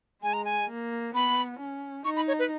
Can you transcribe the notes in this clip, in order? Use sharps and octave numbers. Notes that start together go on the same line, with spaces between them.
G#3 G#5
A#5
G#5
A#3
B3 B5
C#4
D#4 C#6
B5
C#5
B4